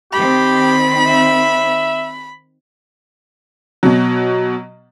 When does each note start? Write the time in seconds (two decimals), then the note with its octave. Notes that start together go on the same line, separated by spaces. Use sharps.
0.13 D#3 C4 G4 B5
1.06 E5
3.83 B2 F#3